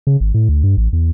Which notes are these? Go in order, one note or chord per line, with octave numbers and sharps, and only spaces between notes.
C#3
G#1
A2
D2
G2
A1
E2